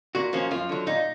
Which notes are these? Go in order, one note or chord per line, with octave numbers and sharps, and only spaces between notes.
A#2 F#4
F3 A#3 C#4
F#2 F4
D3 F#3
A#2 D#4